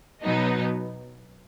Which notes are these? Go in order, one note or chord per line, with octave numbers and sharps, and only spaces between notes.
B2 F#3 B3 D#4